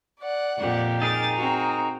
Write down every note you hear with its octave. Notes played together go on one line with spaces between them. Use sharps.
D5 F#5
F2 A#2 G4
D#4 G#4 A#4 A6
C4 F#4 A#5